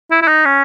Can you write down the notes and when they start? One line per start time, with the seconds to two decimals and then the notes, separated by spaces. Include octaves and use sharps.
0.11 E4
0.22 E4
0.27 D#4
0.45 C#4